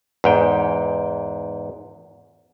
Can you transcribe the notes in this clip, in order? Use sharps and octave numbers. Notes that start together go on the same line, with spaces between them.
E2 G#2 G5